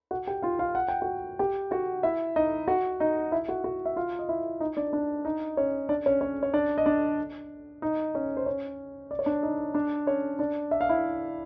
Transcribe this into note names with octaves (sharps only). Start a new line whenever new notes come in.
F#4 F#5
G4 G5
F4 F5
F4 F5
F#5
G5
F#4 F#5
G4 G5
F#4 F#5
E4 E5
D#4 D#5
F#4 F#5
D#4 D#5
E4 E5
F#4 F#5
F#4 F#5
E5
F4 F5
D#5
E4 E5
D#4 D#5
D4 D5
D4 D5
D#4 D#5
C#4 C#5
D4 D5
C#4 C#5
C#4 C#5
C#5
D4 D5
D#5
D4 D5
D#4 D#5
C#4 C#5
C5
C#4 C#5
D5
C#5
D4 D5
D#4 D#5
D4 D5
C#4 C#5
D4 D5
E5
F5
E4 E5